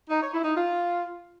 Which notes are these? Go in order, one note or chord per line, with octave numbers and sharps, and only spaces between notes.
D#4
C#5
E4
D#4
F4